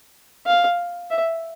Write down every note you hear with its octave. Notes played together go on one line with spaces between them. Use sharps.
F5
E5